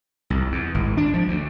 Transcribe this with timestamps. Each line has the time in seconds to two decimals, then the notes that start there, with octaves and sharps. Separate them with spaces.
0.30 C2
0.52 E2
0.75 G#1
0.97 D4
1.14 F3
1.28 D2